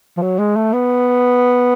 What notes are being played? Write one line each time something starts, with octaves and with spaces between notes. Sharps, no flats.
F3
F#3
G#3
A3
B3